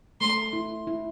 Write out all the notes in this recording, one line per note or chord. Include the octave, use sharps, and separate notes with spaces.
A3 C6
E4
E4